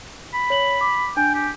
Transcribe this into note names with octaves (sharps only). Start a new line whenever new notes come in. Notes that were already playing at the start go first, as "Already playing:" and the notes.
B5
C#5 F#7
D6
D4 G5 G#5
G4